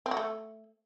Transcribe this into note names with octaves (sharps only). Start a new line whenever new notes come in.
C4
F#4
A3